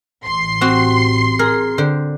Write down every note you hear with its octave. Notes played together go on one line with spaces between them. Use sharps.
A1 C6 C7
C4 F#4 G4
G#4 A#4
D3 C5 G5